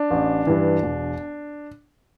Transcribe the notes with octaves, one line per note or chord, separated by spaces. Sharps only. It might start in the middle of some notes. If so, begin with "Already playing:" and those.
Already playing: D4
A1
G2 E3
E1